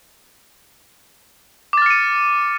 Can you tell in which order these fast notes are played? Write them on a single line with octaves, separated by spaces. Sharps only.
D6 A6 F6 C#7 D#7